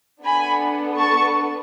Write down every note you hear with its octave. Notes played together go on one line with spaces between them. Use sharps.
B3 D4 A4 G#5 B5
A5 C#6